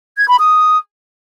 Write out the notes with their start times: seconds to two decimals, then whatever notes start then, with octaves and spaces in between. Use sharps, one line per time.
0.17 G#6
0.28 B5
0.39 D#6